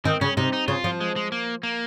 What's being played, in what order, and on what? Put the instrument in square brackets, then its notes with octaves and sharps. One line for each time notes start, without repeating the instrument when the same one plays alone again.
[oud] D#3 [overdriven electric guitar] C4
[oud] C#3 [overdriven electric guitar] C#4
[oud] C3 [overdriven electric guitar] D#4
[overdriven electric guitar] D#4
[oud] C#3 [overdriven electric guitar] F4
[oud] F3
[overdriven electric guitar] G#3
G#3
A#3
A#3